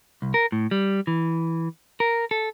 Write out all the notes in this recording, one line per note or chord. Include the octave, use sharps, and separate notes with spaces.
C2
A#4
A2
G3
E3
A#4
A4